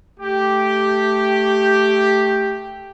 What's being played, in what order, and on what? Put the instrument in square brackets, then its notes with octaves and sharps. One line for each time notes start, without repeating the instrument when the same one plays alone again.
[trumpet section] A3 G4